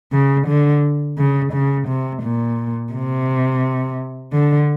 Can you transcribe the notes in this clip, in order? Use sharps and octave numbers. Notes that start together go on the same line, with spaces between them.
C#3
D3
C#3
C#3
C3
A#2
C3
D3